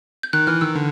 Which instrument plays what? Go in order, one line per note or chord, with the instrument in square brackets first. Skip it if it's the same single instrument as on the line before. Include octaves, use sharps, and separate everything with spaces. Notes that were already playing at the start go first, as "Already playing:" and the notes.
[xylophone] G6
[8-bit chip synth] D#3 [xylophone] F#6
[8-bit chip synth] E3 [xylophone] F6
[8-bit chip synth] D#3 [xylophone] E6
[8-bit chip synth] D3